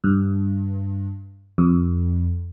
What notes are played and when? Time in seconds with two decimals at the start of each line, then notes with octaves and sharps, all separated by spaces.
0.04 G2
1.58 F2